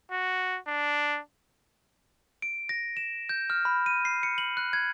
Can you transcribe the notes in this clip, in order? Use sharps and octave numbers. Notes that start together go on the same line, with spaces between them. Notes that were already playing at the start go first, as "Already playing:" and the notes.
F#4
D4
D7
A#6
E7
G6
F6
B5
D#7
C7
C#7
F#7
F#6
G#6